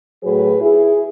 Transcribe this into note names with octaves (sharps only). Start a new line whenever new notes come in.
A2 F#3 G#4 B4
E4 G#4